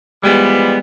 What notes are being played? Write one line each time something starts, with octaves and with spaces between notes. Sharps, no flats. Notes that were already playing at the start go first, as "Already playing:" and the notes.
E3 F3 G3 G#3 B3